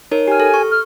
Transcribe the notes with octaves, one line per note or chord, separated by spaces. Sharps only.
D#4 A#4 C#5
G4 G#5 F6
A4
C#6
F6